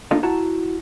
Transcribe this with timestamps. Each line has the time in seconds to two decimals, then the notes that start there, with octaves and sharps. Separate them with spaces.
0.11 A#3 D4 D#4 F4 A4 D#5
0.23 E4 F#4 A5 A#5